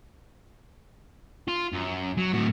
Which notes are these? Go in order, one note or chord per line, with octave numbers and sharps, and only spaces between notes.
F4
F#2
F#3
A2 F#4